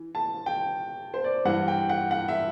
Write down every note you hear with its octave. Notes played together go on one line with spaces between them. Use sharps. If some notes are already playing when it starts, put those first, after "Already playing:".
Already playing: E3
A5
G5
C5
D5
G2 E3 F#5
G5
F#5
F#5
E5